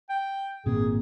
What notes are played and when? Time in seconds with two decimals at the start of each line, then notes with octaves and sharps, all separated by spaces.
0.10 G5
0.66 G#1 A#2 C4 G#4